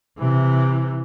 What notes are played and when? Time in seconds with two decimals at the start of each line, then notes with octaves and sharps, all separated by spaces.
0.18 C3 E3